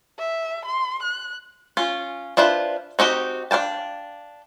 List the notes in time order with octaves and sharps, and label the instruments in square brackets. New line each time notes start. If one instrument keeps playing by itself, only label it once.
[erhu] E5
C6
F#6
[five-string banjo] C#4 F4
D4 E4 F4 B4 C5
C4 D#4 F#4 G4
D4 F5 G5 A5